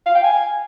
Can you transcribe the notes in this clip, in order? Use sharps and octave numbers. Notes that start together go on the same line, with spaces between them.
F5
G5
G#5